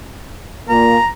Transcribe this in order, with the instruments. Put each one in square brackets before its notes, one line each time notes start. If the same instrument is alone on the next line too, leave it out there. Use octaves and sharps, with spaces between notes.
[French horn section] A#2 A#3 [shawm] A#5